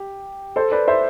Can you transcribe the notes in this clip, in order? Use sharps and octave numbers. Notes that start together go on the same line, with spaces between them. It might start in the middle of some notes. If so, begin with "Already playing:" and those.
Already playing: G4
A4 C5
B4 D5
C5 E5